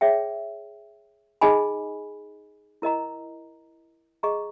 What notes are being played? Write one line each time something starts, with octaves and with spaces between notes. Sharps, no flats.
G#4 C#5 E5 G5
D#4 G#4 D#5 G#5 B5
E4 A#4 D#5 A#5
G#4 D#5 A#5 C#6